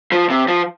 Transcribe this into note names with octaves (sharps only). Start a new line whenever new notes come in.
F3
C3
F3